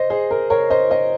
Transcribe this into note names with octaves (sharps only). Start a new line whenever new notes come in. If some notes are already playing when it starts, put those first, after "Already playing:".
Already playing: C5 D#5
G#4 C5
A#4
A#4 C#5
C5 D#5
C5 D#5